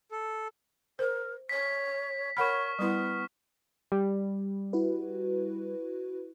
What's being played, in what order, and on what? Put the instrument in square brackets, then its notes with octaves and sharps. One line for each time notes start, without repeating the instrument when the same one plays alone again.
[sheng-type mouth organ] A4
[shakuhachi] A#4 [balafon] C5
[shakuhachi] C#5 [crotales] B6
[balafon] A#4 F#5 B5 [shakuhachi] C#5 [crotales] C#6 F6
[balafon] G3 E4 [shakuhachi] B3
[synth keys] G3
[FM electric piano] E4 F#4 B4